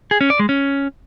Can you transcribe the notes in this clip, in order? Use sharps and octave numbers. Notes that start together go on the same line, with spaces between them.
G#4
C#4
D5
G#3
C#4